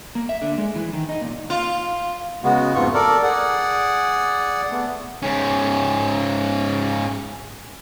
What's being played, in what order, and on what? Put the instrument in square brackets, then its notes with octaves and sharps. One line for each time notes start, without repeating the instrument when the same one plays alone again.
[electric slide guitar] A#3
E5
D3
G#3
E3
D#3
D#4
A#2
[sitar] F4
[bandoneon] C#3 G#3 B3 F#4
F2 G#2 A3 B3 F4 C#6
A4 A#4 D5
G#4 D5 F#5
A3 B3
[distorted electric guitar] G#2 C#4